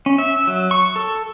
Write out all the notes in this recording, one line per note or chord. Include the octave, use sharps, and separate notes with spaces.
C#4
E5
F#3
C#6
A4